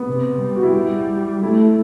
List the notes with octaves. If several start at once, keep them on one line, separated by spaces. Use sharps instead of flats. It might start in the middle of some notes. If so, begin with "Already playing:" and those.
Already playing: B3
C3
G3
F#4
E4
A3 E4